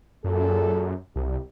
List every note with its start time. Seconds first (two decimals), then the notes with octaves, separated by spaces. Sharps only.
0.24 F#2 A#2 G#4 A4
1.16 C2 G3